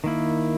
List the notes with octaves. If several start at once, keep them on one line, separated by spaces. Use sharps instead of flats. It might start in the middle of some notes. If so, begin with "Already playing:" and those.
D#3 A#3 E4